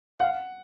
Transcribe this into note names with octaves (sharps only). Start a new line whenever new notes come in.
F5 F#5